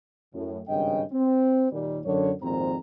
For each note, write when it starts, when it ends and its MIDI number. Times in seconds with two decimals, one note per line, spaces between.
0.34 0.60 42
0.34 0.60 45
0.69 1.03 32
0.69 1.03 43
0.69 1.03 49
0.69 1.03 75
0.69 1.03 79
1.12 1.68 60
1.72 1.99 39
1.72 1.99 46
1.72 1.99 55
2.06 2.32 42
2.06 2.32 50
2.06 2.32 73
2.41 2.76 32
2.41 2.76 41
2.41 2.76 46
2.41 2.76 60
2.41 2.76 72
2.41 2.76 82